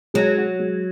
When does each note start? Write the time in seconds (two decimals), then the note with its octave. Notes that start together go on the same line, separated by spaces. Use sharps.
0.14 F#3 G#3
0.37 F#4
0.59 G#3